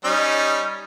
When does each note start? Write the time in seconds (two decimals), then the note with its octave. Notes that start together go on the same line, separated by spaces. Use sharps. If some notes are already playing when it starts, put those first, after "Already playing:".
0.05 G3 C#4 D#4